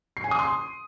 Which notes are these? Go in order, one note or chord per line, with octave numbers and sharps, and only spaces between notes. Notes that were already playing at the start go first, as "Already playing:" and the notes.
C7
G#5
D#6
C6